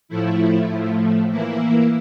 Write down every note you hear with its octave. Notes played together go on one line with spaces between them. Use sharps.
A2 F3 A3 E4
A2 F3 A3
E3 A#3 E4